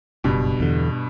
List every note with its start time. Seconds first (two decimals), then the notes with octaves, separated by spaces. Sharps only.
0.24 F#1 G2 B2
0.60 E2 D3